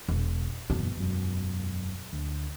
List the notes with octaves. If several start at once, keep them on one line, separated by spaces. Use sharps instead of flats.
E1
F#1 B1 E2 B2
E1 F#2
D2